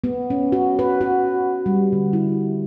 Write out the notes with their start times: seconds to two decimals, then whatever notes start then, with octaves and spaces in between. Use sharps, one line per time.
0.04 B3
0.30 C#4
0.52 F#4
0.79 B4
1.01 F#4
1.66 G3
1.93 D3
2.13 E4